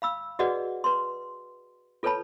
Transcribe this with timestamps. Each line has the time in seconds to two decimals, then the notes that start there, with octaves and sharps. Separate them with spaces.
0.02 F5 B5 E6
0.39 F#4 G#4 B4 D5 D#5 F#5
0.84 B4 C6
2.03 F4 A4 B4 C#5 A5 B5